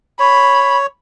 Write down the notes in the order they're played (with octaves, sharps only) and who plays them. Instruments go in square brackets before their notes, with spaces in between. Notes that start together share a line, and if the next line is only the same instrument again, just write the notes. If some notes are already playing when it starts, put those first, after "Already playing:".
[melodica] C#5 [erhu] B5